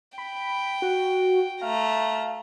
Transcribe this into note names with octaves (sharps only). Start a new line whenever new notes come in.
G5 B5
F#4
A3 F5 A#5